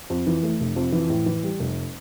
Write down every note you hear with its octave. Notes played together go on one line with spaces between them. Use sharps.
F2
E3
A3
F1
F2
E3
A2
E3
G3
F1